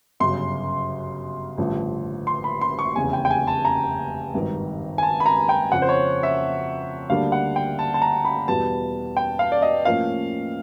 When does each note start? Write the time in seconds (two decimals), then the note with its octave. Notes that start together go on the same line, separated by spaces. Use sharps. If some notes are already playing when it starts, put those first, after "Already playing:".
0.20 G1 F#2 C#3 C6
1.58 A1 G2 D3 F3
2.27 C6
2.44 B5
2.61 C6
2.79 C#6
2.95 F1 E2 C#3 G#5
3.13 G5
3.25 G5
3.31 G#5
3.47 A5
3.65 A#5
4.34 G#1 G2 D#3
4.98 G#5
5.03 A5
5.20 B5
5.26 A#5
5.49 G5
5.72 F2 C#3 F3 F#5
5.82 C5
5.89 C#5
6.23 E5
7.09 D2 D3 G3 A#3 D4 F5
7.32 F#5
7.56 G5
7.79 A5
7.94 A5
8.02 A#5
8.25 B5
8.48 E2 B2 G3 B3 A5
9.17 G5
9.39 F5
9.52 D5
9.62 D#5
9.85 A2 F3 A#3 C#4 F5